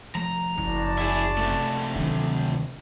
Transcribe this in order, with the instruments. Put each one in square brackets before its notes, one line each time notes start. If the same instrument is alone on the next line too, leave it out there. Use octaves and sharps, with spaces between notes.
[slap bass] F3 A3 [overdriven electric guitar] A#5
[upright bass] F#1 C#4 [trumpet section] F#4 D5 A5
[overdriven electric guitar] E4 G#4
C3 A3
[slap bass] D2 D#3 D4 [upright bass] F#3